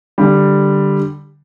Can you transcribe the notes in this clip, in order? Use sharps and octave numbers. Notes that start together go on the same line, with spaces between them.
D3 G3